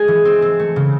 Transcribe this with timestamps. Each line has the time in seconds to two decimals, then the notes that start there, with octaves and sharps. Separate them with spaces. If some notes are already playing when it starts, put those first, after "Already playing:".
Already playing: G#3 G#5
0.08 E3
0.25 C4
0.42 C4
0.60 A3
0.76 C#3